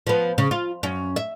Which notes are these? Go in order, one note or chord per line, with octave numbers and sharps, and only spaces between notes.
F3 B3
C#3
F4
F#2 C#4
E5